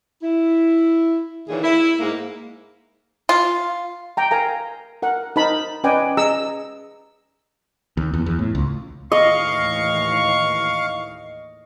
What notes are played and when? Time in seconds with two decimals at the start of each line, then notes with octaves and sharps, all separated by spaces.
0.21 E4
1.49 D#2 A#2 C#3 E3 G#4
1.62 E4
2.00 G#2 A#3
3.29 F4
4.17 G5 A#5
4.31 A#4 F5 G#5 A#5
5.02 A#4 F#5
5.36 D#4 A#4 C5 A5 B5
5.84 C#4 B4 D5 D#5 G5 G#5
6.17 G#4 D#5 A#5 E6
7.97 D#2
8.14 E2
8.26 E2
8.39 A2
8.55 C#2
9.12 D#2 A2 E3 D#5 F5 C#6